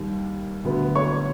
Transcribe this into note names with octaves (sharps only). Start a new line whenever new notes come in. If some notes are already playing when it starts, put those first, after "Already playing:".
Already playing: D#2 D#3 G3
D2 D3 F#3 B3
C#5 C#6